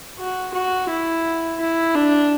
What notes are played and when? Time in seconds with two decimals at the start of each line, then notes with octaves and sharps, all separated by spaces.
0.19 F#4
0.54 F#4
0.89 E4
1.60 E4
1.95 D4